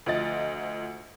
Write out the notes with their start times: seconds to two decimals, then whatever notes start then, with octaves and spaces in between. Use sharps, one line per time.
0.06 D2 F3 D#5 A6